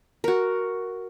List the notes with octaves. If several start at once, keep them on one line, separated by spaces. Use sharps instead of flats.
F#4 A#4